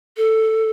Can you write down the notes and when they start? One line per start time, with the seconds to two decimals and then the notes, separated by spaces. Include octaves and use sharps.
0.17 A4